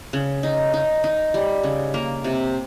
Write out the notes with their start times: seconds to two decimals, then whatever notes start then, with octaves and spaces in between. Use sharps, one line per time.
0.13 C#3
0.43 D#4
0.74 D#4
1.04 D#4
1.34 G3
1.63 C#3
1.94 A#3
2.24 C3